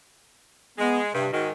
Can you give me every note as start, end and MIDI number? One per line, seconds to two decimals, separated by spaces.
0.78 1.09 56
0.78 1.00 59
1.14 1.27 43
1.14 1.28 48
1.33 1.51 44
1.33 1.51 51
1.33 1.48 66